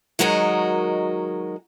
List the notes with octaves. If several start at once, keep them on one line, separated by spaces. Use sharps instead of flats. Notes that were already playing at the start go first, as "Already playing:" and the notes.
D#3 F#3 G#3 F#4 A#4 D#5